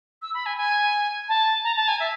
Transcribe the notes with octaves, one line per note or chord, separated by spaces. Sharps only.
E6
B5
G#5
G#5
A5
A#5
A5
G#5
E5